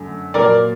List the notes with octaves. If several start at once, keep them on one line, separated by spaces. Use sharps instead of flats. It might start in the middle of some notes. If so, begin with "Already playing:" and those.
Already playing: F#2 D3 A3
A#2 F#3 A#3 A#4 D5